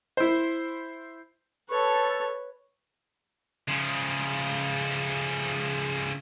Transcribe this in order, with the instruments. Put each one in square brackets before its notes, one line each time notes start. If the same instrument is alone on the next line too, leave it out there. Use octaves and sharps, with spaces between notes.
[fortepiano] E4 C5
[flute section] A4 [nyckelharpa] B4 C#5
[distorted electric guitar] C#3 F3